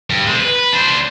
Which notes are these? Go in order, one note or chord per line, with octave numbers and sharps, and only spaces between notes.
G2
G#3 C4
B4
D4 C5